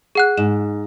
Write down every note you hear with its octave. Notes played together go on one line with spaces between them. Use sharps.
G#4 F#5 F#6
G#2 E7